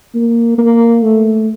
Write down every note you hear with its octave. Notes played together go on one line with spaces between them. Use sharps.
A#3
A#3
A3